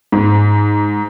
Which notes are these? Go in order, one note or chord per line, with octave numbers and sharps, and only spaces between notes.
G#2